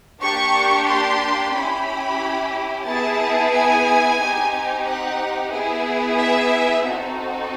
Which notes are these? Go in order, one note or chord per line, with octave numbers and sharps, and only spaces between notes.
A#3 D4 G4 C#6
C6
C#4 E4 G4 B5
B3 E4 G#4 A5
G#5
C4 D#4 G4
F#5
B3 E4 G#4
E5
C4 D#4 F#4 A4